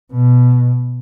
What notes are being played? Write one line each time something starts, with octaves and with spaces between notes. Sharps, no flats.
B2